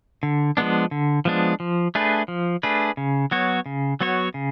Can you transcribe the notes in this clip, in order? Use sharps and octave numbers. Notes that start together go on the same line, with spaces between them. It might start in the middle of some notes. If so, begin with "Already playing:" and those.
D3
F3 G#3 B3 D4
D3
F3 G#3 B3 D4
F3
A3 D4 G#4 B4
F3
A3 D4 G#4 B4
C#3
F#3 B3 F#4 C#5
C#3
F#3 B3 F#4 C#5
C#3